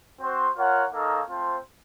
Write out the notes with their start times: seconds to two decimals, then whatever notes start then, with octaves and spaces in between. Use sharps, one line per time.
0.21 C4 F#4 C5
0.57 F4 A#4 C#5 F#5
0.93 A#3 D#4 A4 C#5 F5
1.29 A3 C4 F4 C5